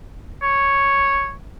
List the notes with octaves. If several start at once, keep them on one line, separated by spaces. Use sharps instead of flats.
C#5